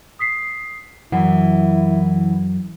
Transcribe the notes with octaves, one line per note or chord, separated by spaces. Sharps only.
D#6 B6 C7
F#2 E3 E4 F#5